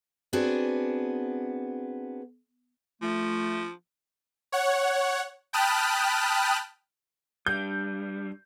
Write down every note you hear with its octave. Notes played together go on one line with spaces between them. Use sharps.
B3 C4 D4 F#4 G#4
F3 A3
C#5 F#5
G5 A5 B5 D#6 F6 F#6
G3 D4 G6